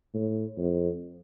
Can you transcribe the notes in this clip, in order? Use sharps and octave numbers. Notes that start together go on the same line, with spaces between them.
A2
F2